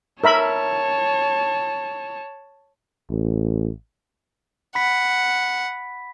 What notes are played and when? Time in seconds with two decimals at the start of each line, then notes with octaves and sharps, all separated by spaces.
0.24 A#4 C#5 E5 A5 B5
3.10 A1
4.75 F#5 B5 B6